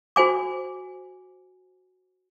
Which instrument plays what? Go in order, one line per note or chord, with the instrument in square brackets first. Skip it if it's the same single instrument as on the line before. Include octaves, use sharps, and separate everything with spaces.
[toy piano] F#4 C5 G#5 D6